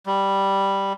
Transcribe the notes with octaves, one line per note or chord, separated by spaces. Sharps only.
G3